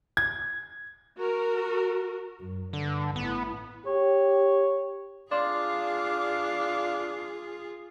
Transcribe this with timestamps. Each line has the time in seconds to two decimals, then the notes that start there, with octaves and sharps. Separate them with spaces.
0.17 G#6
1.18 F#4 A#4
2.40 F#2
2.73 G2 D3
3.16 A1 B3 E4
3.86 G4 C#5
5.32 D4 F4 G#4 D5 F5 C6 D6